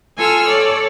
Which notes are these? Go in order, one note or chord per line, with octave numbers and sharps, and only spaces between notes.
F4 A4 G#5 E6 F6
A4 C#5 D5